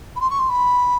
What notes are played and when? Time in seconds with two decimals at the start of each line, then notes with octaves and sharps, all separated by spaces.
0.16 B5
0.21 C6
0.30 C#6
0.39 C6
0.49 B5